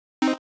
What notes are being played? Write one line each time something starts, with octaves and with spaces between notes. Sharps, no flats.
C4 D#4